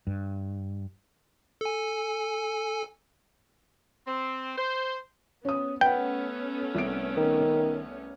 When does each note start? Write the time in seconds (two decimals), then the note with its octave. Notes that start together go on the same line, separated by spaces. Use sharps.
0.07 G2
1.61 A4 G#5
4.07 C4
4.58 C5
5.45 B3 C#4 D#6
5.81 A3 B3 C#4 B4 F#5 G5
6.75 C2 D7
7.17 D#3